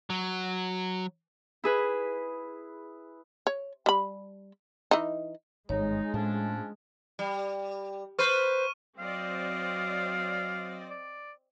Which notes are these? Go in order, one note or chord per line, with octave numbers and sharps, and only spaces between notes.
F#3
E4 G#4 B4
C#5
G3 B5
E3 D#4
G#1 G2 G#3 D#4 C#5
A2 F3 A3 C#4 D4
G3
B4 C5 C#6 F6 D#7
F#3 C4 D5 D#5 F5
D5